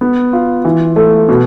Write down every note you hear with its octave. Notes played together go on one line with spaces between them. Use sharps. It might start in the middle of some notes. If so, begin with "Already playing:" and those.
B3
F4
E3
A3
B2